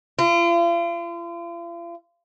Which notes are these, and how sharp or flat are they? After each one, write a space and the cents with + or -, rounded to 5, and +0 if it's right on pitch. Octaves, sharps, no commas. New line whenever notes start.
F4 -40